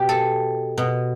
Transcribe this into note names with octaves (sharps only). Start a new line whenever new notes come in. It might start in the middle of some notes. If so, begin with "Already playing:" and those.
Already playing: B2 G4 B4
A4
B2